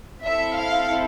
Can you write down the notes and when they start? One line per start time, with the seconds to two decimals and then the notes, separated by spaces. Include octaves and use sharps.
0.23 C4 E4 A4 E5
0.57 F5